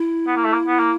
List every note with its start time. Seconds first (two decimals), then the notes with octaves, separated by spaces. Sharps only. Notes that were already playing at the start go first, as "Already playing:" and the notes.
Already playing: E4
0.27 B3
0.36 A#3
0.44 A3
0.53 A#3
0.67 B3
0.79 A#3